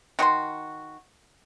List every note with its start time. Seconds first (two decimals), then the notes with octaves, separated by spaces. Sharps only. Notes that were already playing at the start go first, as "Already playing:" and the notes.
0.19 D#3 F#4 G#4 C6